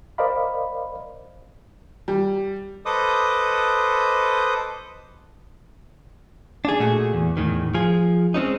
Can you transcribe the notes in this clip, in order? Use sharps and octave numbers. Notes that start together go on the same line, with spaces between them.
A#4 C5 D5 D#5 F5 B5
G3
A4 B4 C5 D#5 D6 D#6
D4 G#4
A#2 A3 F#4 G#4
E2
E2 A2 D#3
F3 G#4
G#3 C4 C#4 D#4